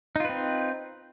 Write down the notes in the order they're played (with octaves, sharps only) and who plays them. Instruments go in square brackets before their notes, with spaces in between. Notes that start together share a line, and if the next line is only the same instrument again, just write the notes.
[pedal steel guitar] D#4
F4
B4
C4